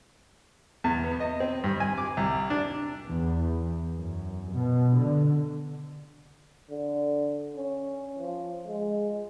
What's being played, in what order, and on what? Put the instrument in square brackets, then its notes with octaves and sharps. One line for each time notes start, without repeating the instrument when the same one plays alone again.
[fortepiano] E2
B3
D#5
C4
G2
G#5
D6
C2
D4
[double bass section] E2
F#2
B2
D3
[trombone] D3
C#4
F3
G#3